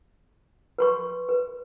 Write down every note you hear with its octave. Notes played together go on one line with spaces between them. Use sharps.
B4 C6 C#6
B4